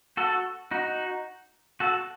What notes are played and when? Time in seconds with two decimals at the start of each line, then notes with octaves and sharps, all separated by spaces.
0.17 F#4 A4
0.71 D#4 F#4
1.80 F#4 A4